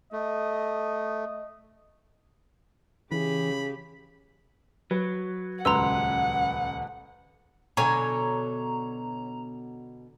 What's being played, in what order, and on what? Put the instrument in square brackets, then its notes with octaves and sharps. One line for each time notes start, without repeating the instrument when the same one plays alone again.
[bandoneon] A3 [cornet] D#5
[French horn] C#3 [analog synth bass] E3 [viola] G4 G#4 [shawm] B5
[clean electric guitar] F#3 [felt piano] B4
[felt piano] D#1 C#2 B4 [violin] F#5 [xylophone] A#5 C6 E6
[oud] B2 [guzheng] D3 F#3 [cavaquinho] C#5 G#5 [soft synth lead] A#5